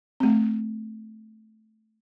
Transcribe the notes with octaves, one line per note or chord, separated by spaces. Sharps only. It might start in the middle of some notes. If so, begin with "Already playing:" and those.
A3 C4